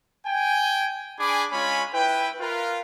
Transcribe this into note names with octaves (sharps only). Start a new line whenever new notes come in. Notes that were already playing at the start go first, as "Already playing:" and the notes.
G5 G#5
D4 G#4 G#5 B5 D6
G#3 C#4 F4 C#5 G#5 B5
E4 B4 G5
F4 A#4 B4